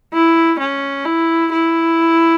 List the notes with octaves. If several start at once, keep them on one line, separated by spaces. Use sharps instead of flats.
E4
C#4
E4
E4